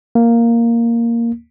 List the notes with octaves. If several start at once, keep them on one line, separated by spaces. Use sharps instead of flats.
A#3